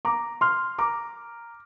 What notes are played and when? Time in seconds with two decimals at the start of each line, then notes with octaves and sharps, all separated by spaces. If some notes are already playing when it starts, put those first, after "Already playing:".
0.05 A#5 D6
0.41 C6 F6
0.79 A#5 D6